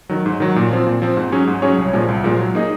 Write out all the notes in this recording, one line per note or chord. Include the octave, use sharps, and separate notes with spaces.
D#3 F#3
G#2
D#3 F#3
A#2
F3 C4
A#2
F3 C4
G#2
F#3 C#4 G#4 C#5
G#2
F#3 C#4 G#4 C#5
C2
A#2 F3 G#3
C2
A#2 F3 G#3
F#3
A#3 D#4 G#4 D#5